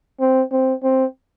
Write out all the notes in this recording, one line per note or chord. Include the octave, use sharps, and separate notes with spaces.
C4
C4
C4